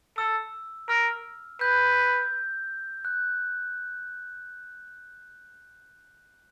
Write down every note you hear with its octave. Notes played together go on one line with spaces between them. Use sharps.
A4 E6
A#4 F6
B4 G6
F#6